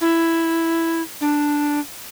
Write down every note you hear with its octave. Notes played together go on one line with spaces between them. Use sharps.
E4
D4